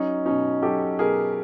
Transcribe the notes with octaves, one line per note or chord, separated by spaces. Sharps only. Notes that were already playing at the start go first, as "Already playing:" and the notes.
Already playing: F#3 C#4 D#4
B2 C#4 D#4
F#3 G4 A4
B2 G#4 A#4